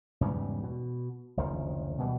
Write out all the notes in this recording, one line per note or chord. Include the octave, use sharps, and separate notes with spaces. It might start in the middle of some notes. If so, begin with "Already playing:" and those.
E2 G#2 C#3 G3
B2
F#1 D2 D#3 F3
B2 E3 G3